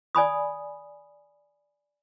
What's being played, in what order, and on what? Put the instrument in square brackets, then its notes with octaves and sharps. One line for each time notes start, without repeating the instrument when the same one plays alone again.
[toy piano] D5 G#5 B5 D#6